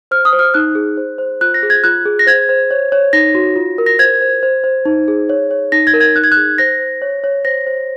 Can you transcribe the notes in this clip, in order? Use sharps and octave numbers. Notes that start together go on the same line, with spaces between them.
C5 F6
D#6
C5
F6
D#4 F#6
G#4
C5
C5
F4 F#6
A#6
G#4
G#6
F4 F#6
G#4
A#6
C5 G#6
C5
C#5
C#5
D#4 A#6
F#4
F4
A#4
A#6
C5 G#6
C5
C5
C5
D#4
G#4
C#5
C#5
D#4 A#6
G#6
A#4
G#6
D#4 F#6
G#6
G#4 F#6
C5 A#6
C5
C#5
C#5
C5 A#6
C5